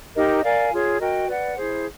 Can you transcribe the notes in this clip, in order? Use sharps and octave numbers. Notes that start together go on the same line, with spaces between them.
D#4 G4 A#4 D#5
A#4 D5 F5 G#5
F4 G#4 C#5
F#4 A#4 D#5 G5
B4 D5 F#5
E4 G#4 C5